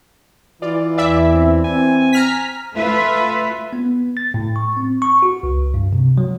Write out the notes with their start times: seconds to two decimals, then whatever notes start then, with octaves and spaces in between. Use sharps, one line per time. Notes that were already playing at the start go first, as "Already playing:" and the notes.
0.62 E3 F4 D5
0.97 E2 E4 D5 E5
1.34 C4
1.64 C4 G#5
2.13 A#5 F6 B6
2.76 A3 F4 B4 E5
3.73 B3
4.17 A6
4.34 A2
4.56 C#6
4.77 C4
5.02 C#6
5.22 F#4
5.43 C#2
5.74 G2
5.93 C3
6.18 F#3